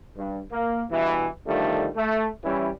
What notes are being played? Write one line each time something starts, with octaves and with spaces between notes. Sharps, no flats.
G2
A#3
G2 B2 E3
D3 D#3 F3 G3 A3
A3
E3 G3 C#4 E4